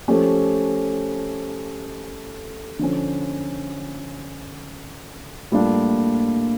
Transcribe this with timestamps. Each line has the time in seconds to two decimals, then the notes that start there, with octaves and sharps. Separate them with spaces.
0.08 F3 A3 C#4 G4
2.79 D3 F3 C#4
5.52 A2 G3 A#3 D4 F4